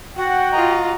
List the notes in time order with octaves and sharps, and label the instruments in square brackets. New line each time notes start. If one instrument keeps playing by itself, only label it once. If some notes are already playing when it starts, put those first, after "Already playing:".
[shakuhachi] F#4 [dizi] F#5 [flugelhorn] G5
[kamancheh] F4 D#5 [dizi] A#5